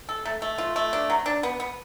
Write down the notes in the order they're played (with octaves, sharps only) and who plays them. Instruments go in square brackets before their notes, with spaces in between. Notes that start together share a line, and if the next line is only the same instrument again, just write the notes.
[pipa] A4
A3
A3
F4
A3
D4
F#3
D4
B3
B3